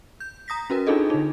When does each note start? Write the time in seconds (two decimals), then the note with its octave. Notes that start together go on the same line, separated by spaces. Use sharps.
0.20 G6
0.48 A#5 D#6 A#6 B6
0.70 C#4 F#4 A#4 B4
0.87 D4 D#4 F4 G#4 A4 D#5
1.10 D3 D#4